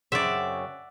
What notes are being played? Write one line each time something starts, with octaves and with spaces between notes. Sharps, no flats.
F#2 C#3 C4 D5 E5 F#5